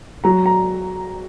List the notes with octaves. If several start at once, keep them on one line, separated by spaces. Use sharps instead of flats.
F#3 A#5
A#5